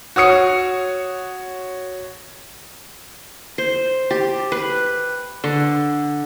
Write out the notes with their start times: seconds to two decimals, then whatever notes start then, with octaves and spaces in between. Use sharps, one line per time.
0.16 F#4 C#5 D#6 C#7
3.58 C5
4.11 G4
4.52 B4
5.44 D3